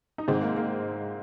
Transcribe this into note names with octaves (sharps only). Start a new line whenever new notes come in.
D#4
G#2 D#3 G#3 C4
A#3
A#3